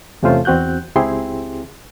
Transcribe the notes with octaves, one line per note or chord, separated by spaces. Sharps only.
E2 C3 A3 C#4 F4 C5
E2 C4 F#4 F#6 G6
C#2 C4 E4 G4 G#4 C6